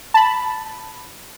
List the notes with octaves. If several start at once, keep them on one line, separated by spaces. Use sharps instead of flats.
A5 B5